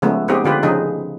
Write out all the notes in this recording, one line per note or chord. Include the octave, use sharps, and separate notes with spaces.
C#3 F3 G#3 A3 B3
B3 C4 D#4 G4 G#4
D3 F4 G4 B4
C#3 F3 D#4 G#4